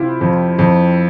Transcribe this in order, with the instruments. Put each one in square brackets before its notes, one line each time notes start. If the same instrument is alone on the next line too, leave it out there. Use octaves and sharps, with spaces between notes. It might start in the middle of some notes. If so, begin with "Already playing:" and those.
Already playing: [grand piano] C3 [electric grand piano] E4 F4 G4
[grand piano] F2
F2